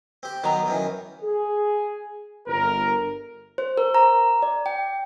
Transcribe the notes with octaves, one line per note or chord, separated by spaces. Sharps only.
C4 G4
D#3 F#3 B3 A#5
F#2 D#3 E3
G#4
G1 A#4
C5
A#4
A#5
D5
G5